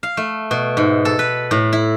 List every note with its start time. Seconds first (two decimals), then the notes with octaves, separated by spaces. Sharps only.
0.03 F5
0.17 A3
0.51 B2
0.77 G#2
1.05 A4
1.19 B4
1.51 A2
1.73 E4